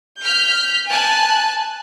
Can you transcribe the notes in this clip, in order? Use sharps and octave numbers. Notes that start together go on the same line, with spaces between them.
F6 G6 B6
G#5 A5 F#6